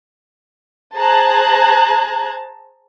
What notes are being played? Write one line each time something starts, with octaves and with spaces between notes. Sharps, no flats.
G#4 C5 A5 A#5 F#6 G#6